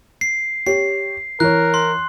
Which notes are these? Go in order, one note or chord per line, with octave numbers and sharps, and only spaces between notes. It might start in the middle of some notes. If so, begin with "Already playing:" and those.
C7
G4 C#5 C7
E3 A#4 C#5 F#6
C6